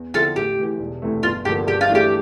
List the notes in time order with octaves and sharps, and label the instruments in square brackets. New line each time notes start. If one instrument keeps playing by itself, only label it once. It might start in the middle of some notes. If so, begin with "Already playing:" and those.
Already playing: [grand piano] E2
[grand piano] D3 F3 C4 E4 [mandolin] F4 A4
[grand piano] A1 [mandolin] G4
[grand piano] A2 E3
E1
D2 C3 E3 A3
[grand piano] G1 [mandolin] F4
[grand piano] G2 D3 F3 A#3 [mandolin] G4
[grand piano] G2 [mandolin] G4
[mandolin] F4
[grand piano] E3 A3 D4
[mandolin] G4